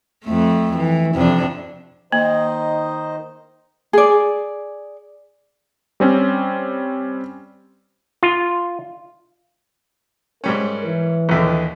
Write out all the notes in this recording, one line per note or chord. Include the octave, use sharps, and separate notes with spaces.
F2 A3
E3
F2 C3 D4
D#3 A#3 D#4 C5 D#5
G#4 D5
G3 C4 C#4
F4
G#2 G3 C#4 A#4
E3
A#1 D#2 D3